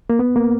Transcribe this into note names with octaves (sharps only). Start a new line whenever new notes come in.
A#3
B3
A#3